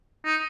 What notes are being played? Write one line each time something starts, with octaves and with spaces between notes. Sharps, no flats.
D#4